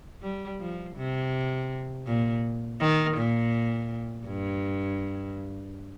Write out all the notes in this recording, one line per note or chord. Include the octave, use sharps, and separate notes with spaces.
G3
F3
C3
A#2
D#3
A#2
G2